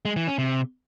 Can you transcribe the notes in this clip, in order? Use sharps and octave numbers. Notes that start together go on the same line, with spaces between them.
G#3
E3
C#4
C3